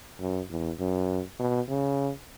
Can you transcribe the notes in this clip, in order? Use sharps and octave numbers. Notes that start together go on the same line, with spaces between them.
F#2
E2
F#2
B2
C#3